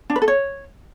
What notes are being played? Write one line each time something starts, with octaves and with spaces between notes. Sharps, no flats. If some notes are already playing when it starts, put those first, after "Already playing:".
D4
B4
A4
C#5